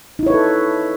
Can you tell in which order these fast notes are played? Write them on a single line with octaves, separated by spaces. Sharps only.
D#4 E4 C#5 B4 A4